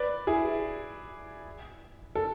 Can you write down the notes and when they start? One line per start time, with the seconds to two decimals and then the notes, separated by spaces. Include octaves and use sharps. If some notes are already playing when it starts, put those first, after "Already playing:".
Already playing: B4 D5
0.27 E4 G#4
2.15 A4